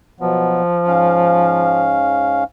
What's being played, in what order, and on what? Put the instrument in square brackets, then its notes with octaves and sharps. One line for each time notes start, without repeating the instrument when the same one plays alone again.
[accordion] B2 F#3 B3 [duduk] F3
[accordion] G#2 C#4 F5